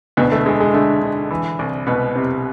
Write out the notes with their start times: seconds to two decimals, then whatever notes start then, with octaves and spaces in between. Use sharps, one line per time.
0.17 D2 B2 B3
0.32 A3
0.45 D3 G#3
0.60 G#3
0.73 D3 A3
1.02 D3
1.30 E3
1.59 C2
1.87 C2 B2 B3
2.15 C3